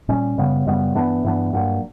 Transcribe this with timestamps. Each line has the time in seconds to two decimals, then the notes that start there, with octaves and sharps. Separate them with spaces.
0.09 A#2 G3 C#4
0.38 F#2 C#3 G3 B3
0.66 F#2 C#3 G3 B3
0.95 G2 E3 B3 D4
1.24 G2 E3 B3 D4
1.53 G2 F#3 A#3 D4